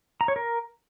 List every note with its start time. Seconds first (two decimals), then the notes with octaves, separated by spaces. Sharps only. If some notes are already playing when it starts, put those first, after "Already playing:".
0.21 A#5
0.28 C#5
0.36 A#4